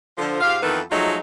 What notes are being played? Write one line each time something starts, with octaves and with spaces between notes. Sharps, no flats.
D3 F3
G#2 F4 G4 F5
F2 D#3 E3 B3 A4 B4
F3 F#3 G#3 A3 D#4 F4